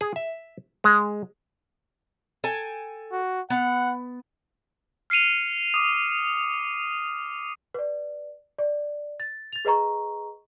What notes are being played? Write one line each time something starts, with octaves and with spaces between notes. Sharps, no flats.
G#4
E5
G#3
A4 G5 G#5
F#4
B3 F#5
F6 C7 C#7 D#7 F7
D6 D#6
B4 D5
D5
A6
A6 F7
G#4 B4 D#5 A#5 C#6